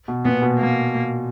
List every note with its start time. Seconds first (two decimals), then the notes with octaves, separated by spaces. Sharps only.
0.08 B2
0.25 A#2 B3
0.42 B2
0.59 A#3